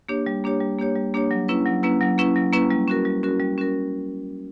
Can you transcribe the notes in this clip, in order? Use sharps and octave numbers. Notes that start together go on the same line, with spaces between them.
A#3 D4 G4 C#5
G3
A#3 D4 G4 C#5
G3
A#3 D4 G4 C#5
G3
A#3 D4 G4 C#5
F#3
A#3 C#4 E4 B4
F#3
A#3 C#4 E4 B4
F#3
A#3 C#4 E4 B4
F#3
A#3 C#4 E4 B4
G3
C#4 F#4 A#4
G3
C#4 F#4 A#4
G3
C#4 F#4 A#4